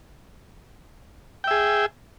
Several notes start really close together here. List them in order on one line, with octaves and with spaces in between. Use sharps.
G5 E5 G#4